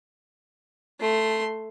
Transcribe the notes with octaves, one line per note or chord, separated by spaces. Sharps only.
A3 C6